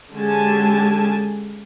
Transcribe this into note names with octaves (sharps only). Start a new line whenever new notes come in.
D3 G#3 C#4 G4 G#5 A5